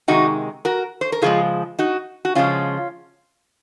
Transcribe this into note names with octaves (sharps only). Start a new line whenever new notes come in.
C3 D#3 G#3 D#4 F#4
F#4 A#4
C5
A#4
C#3 F3 G#3 F4 G#4
D#4 F#4
F#4
C#3 F3 G#3 C#4 F4